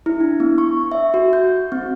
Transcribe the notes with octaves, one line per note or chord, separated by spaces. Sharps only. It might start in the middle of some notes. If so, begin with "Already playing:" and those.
E4
D4
B3
C#6
E5
F#4
G6
C4